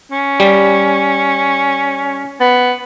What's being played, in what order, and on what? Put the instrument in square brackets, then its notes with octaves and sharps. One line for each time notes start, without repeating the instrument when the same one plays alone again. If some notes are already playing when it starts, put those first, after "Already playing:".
[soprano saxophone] C#4
[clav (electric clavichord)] G3
[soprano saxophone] B3